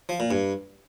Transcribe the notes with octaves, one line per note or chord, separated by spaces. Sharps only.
F3
A#2
G2